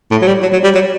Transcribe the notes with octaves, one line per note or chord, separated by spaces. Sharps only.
A2
F#3
G3
F#3
F#3
G3
F#3